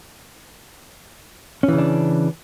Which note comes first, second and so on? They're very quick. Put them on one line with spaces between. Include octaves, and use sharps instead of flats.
C#4 E3 C#3 D4